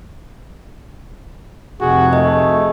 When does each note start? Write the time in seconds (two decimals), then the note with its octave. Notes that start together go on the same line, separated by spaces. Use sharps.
1.80 F1 C3 F#4 G#4
2.13 A3 D#5